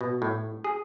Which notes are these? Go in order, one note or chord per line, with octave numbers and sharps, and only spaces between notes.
B2
A2
G#4